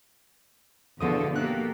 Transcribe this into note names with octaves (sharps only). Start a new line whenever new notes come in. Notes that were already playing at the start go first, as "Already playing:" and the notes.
E2 B2 D3 F3 A4 D#6
A#3 G4 A4 F#6